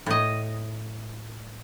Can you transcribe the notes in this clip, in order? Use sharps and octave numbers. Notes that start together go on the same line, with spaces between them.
A2 D#5